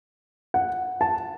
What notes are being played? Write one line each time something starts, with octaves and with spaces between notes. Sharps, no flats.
F#5
A5